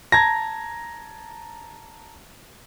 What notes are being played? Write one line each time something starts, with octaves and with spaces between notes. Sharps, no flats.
A5 A#5 G#6 A#6